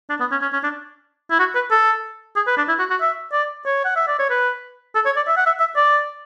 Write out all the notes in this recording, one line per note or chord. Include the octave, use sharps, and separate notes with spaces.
D4
B3
C#4
C#4
C#4
D4
E4
F#4
B4
A4
G#4
B4
D4
E4
F#4
F#4
E5
D5
C#5
F#5
E5
D5
C#5
B4
A4
C#5
D5
E5
F#5
E5
E5
D5